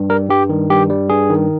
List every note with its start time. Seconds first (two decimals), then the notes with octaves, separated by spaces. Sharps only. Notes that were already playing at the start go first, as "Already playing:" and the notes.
Already playing: G2
0.10 G3 A#4
0.29 G2 G4
0.49 D#3
0.70 G2 G4
0.90 G3
1.10 G2 G#4
1.30 D#3